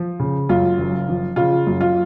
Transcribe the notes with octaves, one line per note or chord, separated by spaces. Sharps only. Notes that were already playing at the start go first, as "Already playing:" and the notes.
Already playing: F3
C#3
F#2 F4
F#1
F3
C#3 F4
F#2
F4